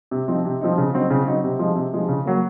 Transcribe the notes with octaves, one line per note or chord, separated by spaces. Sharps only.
C3
F3 C4 D#4
C3
F3 C4 D#4
C#3
F#3 C4 D#4
C#3
F#3 C4 D#4
C3
F3 G#3 D#4
C3
F3 G#3 D#4
C#3
F#3 A#3